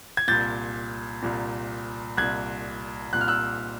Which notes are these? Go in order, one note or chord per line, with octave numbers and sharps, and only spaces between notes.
G#6
C2 A#2 G6 A6
C2 A#2
C2 A#2 F#6 G#6
C2 A#2 F#6
F6
E6 F#6